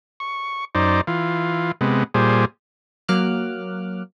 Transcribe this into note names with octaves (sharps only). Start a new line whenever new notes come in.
C#6
F#2 D#4 C5 D5
E3 F4
C3 G#3 B3
A#2 G3 G#4 C5
F#3 A#3 D6 F6 F#6